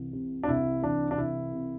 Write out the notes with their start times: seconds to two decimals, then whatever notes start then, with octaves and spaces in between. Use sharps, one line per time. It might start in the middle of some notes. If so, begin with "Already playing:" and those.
Already playing: C2 E3
0.13 C3
0.43 D4
0.48 C2 E4
0.82 E3 D4
1.11 D4
1.18 C2 E4
1.53 C3